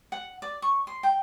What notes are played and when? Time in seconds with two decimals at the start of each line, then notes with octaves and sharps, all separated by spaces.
0.12 F#5
0.42 D5
0.62 C#6
0.87 C6
1.03 G5